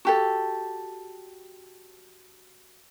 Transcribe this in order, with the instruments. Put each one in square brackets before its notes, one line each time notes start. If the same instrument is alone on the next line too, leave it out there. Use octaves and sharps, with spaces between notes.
[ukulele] F#4 G4 A4